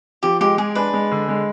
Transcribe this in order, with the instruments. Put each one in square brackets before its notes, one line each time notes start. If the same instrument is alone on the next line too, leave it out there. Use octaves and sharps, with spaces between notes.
[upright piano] F3 [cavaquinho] G4
[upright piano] G#3 [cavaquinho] G4
[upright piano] G#3 [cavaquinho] G#4
[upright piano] D4 [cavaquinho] B4
[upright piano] G#3
D3
G#3